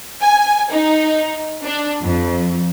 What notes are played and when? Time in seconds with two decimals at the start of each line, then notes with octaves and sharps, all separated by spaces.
0.21 G#5
0.71 D#4
1.64 D4
2.01 F2